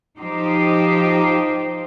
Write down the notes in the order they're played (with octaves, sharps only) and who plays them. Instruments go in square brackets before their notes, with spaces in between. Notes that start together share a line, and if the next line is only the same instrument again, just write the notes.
[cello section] F3 D#4 G4 C5